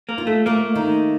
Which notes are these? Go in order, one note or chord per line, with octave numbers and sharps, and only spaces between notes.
A#3
F4
A3
A3 A#3
D#3